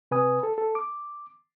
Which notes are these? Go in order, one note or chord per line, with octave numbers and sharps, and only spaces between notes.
C3 B4 G#5 D#6
A4
A4
D6